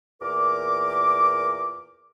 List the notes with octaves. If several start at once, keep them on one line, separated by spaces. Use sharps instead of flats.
E2 A#2 A#4 D6